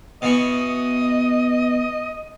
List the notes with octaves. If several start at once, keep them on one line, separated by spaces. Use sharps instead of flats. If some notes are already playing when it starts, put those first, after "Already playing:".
B2 E3 D#5 C#6